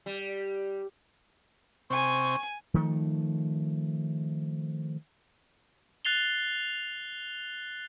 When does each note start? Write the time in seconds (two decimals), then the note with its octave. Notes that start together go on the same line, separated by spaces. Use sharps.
0.06 G3
1.90 C3 C4 G#5 C#6
2.74 D#3 F3 A3
6.05 F#6 A6 C7 F7 G7